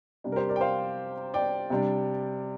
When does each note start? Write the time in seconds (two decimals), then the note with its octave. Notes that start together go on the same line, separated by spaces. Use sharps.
0.24 C3 G3 D4
0.32 A#4
0.36 G4 C5
0.49 A#4 D5
0.56 G5
0.61 C5 F5
1.34 D5 G5
1.70 C3 G3 D4